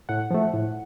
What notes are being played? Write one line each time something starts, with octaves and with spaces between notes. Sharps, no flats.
A2 F#5
F3 A3
A2